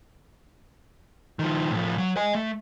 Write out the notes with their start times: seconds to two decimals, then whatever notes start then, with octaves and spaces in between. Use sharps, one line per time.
1.39 D#3 F3
1.71 A2 F3
1.98 F#3
2.16 D#5 G#5
2.35 A3